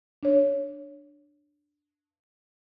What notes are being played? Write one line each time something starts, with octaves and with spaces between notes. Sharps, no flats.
D4 C#5